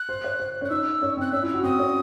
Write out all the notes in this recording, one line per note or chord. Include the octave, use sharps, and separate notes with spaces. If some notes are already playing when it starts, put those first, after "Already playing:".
Already playing: F#6
C5
C#5
C5
C#4 F#6
D#4 E6
C#4
C4 F#6
C#4 E6
E4
E6
F#4
C4 D#6
C#4